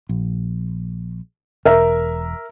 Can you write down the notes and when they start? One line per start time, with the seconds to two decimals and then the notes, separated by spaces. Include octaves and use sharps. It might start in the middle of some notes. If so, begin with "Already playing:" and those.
0.09 A#1
1.65 E1 A#4 E5